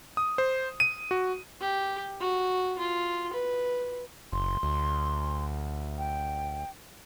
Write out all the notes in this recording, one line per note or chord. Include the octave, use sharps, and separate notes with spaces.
D#6
C5
D#7
F#4
G4
F#4
F4
B4
F#1 C6
D2
G5